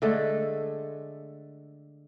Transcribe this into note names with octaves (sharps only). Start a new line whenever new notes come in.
D3 G#3 A3 A4